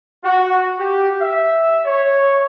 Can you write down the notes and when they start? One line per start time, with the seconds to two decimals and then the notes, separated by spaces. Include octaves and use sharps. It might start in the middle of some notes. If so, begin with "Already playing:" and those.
0.23 F#4
0.79 G4
1.21 E5
1.85 C#5